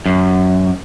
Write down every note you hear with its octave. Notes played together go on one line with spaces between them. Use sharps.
F#2